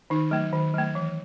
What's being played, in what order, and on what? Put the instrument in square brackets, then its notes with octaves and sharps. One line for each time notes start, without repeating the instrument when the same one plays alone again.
[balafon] D#3 D#4
F#3 A3
D#3
F#3 A3
E3